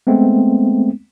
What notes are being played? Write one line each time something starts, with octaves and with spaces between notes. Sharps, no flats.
G#3 A3 B3 C4